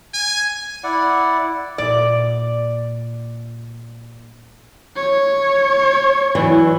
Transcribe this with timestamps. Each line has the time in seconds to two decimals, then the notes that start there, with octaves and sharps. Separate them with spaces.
0.14 G#5
0.84 E4 D5 F#5
1.78 A#2 D5
4.96 C#5
6.35 E3 F#3 D4